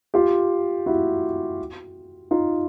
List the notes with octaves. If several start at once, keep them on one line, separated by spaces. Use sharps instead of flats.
F4 G4
E4 F#4
D#4 F4